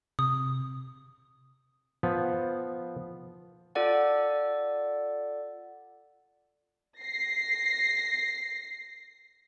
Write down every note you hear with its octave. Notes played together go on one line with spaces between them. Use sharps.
C3 D#6
F3 B3
F4 A4 D5 F#5
A#6 C7